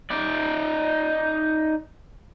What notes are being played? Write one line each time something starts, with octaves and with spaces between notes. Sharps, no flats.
D#4 D5